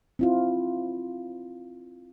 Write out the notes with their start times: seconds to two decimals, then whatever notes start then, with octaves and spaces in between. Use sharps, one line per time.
0.19 C4 E4 F4